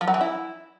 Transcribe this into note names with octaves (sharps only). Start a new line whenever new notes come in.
F3
F#3
E3
E4